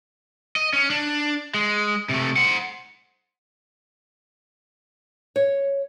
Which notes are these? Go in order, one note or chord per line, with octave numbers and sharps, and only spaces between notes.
D#5
C#4
D4
G#3
C3 A3
C5 F#5
C#5